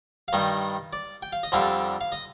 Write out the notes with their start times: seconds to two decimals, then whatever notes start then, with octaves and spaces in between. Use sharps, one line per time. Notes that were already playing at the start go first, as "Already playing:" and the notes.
0.28 F5
0.33 G2 D#3 G3 D#5
0.93 D5
1.22 G5
1.33 F5
1.43 D#5
1.52 F2 D3 G3 D4 F5
2.01 F5
2.12 D#5